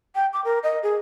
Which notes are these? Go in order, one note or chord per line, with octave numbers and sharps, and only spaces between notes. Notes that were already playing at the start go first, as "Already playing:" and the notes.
G5
D6
A#4
D#5
G#4